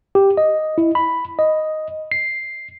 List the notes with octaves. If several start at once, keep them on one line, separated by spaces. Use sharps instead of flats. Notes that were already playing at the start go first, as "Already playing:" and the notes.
G4
D#5
E4
B5
D#5
C7